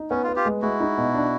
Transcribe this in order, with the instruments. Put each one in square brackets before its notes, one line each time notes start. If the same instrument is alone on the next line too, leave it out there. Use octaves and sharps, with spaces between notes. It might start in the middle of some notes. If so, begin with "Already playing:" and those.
Already playing: [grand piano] D#4
[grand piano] B3 [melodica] C#4
[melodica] F4
[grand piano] B3
[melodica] F4 G4
[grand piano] G#3
[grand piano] G#3 [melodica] E4 F#4
[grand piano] D#4
B2
D4